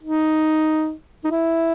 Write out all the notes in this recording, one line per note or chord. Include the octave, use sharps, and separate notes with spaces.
D#4
D#4
E4